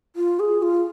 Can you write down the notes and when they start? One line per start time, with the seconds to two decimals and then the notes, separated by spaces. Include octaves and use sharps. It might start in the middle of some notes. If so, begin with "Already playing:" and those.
0.16 F4
0.40 G#4
0.62 F4